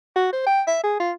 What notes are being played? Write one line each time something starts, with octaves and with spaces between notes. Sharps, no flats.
F#4
C5
G5
E5
G#4
F4